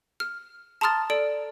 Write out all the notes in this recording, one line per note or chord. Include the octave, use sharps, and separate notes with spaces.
F6
A5 A#5 C6 D#6 F6 A6
A4 D5 D7